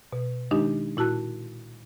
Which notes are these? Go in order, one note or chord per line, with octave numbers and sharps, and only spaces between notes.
B2
D#3 G#3 D4 D#4 G4
A#2 E4 F#4 A5 F#6